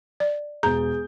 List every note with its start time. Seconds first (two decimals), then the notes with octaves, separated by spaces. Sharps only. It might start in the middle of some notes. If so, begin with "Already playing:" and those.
0.20 D5
0.63 E1 G#4 A#5 G6